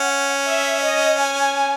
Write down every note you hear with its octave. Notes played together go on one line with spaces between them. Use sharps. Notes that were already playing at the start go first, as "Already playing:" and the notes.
Already playing: C#4 F#5
E5
D#5
G#5